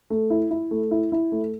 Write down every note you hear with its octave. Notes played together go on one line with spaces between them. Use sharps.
A3
E4
E4
A3
E4
E4
A3